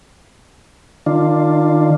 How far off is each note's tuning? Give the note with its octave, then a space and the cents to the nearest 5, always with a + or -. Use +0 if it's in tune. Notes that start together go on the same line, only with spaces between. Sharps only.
D#3 -25 D4 +5 F4 +0